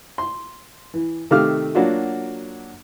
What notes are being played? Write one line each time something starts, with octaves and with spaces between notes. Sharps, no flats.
C6
E3
C3 D#3 A3 F5 D6 F6
F#3 A#3 D4 F4 F#4